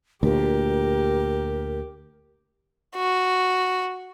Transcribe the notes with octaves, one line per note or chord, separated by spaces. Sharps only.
D2 A#2 G4 A#4
F#4